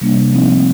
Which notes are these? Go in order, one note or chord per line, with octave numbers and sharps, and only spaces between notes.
C3 G3 A#3 D4
F3 A3 C4 D#4